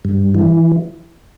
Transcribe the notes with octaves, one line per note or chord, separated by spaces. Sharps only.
G2
E3